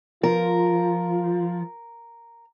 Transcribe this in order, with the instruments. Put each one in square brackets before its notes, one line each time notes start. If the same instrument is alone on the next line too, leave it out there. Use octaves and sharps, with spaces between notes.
[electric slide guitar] F3 [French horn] F4 [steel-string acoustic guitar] A#4